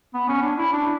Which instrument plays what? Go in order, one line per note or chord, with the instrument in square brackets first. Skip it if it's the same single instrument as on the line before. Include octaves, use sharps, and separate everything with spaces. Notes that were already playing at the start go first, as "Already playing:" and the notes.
[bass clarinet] B3
C#4
D4
E4
D4